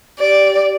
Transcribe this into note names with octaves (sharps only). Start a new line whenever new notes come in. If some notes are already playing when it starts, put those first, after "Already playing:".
G4 D5